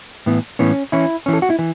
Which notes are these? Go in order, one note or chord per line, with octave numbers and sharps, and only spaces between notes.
A2 E3 B3
A2 E3 B3 C#4
E3 C#4 E4
E3 C#4
A4
F#4
E4
E3